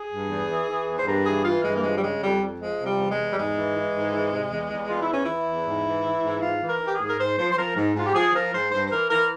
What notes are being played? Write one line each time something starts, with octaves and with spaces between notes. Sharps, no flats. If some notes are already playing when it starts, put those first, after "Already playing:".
Already playing: G#4
G2
E2
E3
E3
E2
C5
G2 A#4
E3 G#4
E3 F4
G2 G#3
A#3
F3 G#3
G3
C#3 G#3
F2 G3
F2
F3 G#3
C3
G3
E2
G#3
E2
G3
G#2 G#3
E3
E3
G#2
E3
C3
E2
E2
E2 F4
E4
E3 C#4
E3 E4
E2
G#2
E3
E3
G#2
G#2 F4
E3
A#4
E3
G4
G#4
G#2
A#4
G#2 C5
F3 C5
C5
F3 A#4
G#2
G#2 F4
G4
F3 G#4
F3 A#4
G#2 C5
G2 C5
C5
E3 A#4
E3 A#4